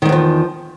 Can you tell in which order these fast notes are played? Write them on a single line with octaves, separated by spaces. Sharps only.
D#3 G2 E2 F3